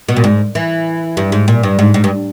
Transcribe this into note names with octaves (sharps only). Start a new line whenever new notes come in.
B2
A#2
G#2
E3
G2
G#2
A#2
G2
G#2
G#2
G2